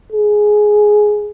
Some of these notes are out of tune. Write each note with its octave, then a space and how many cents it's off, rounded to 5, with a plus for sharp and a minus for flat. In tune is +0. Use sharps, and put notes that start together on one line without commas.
G#4 +10